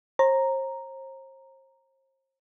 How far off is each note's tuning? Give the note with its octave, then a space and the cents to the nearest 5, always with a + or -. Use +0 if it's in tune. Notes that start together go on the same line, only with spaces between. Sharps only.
C5 +40 A#5 +0